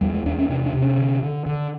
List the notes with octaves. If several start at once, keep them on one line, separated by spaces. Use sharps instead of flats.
E2 G3
G#3
E2 D4
C#4
C3 D4
D4
C3
C#4
D3
D3
D3